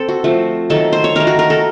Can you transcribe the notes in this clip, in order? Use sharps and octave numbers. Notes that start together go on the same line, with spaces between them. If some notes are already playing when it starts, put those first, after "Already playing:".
Already playing: C4 A4 C5
F#4
F3 A3 C4
D#3 F#3 A3 A4
C5
C#5
D#3 F#3 A3 A#4
F#4
A#4
A4